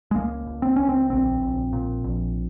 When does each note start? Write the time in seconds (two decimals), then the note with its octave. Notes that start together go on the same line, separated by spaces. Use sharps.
0.11 G#3
0.15 C#2 A#3
0.47 C#2
0.62 C4
0.76 C#2 C#4
0.89 C4
1.10 A#1 C4
1.41 A#1
1.73 A#2
2.04 A#1